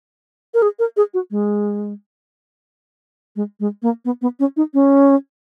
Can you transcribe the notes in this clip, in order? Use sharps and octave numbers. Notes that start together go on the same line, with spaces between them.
A#4
G#4
A#4
G#4
F#4
G#3
G#3
G#3
A#3
B3
B3
C#4
D#4
C#4